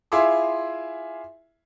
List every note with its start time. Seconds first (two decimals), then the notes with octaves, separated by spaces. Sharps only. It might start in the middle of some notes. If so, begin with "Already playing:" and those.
0.12 E4 F4 G#4 E5 C6 D6